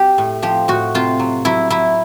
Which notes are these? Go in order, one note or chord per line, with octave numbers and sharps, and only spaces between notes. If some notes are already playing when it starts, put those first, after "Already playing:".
Already playing: G4
A2
F3 G4
A2 F#4
C3 F4
F#3
F#3 E4
F#3 E4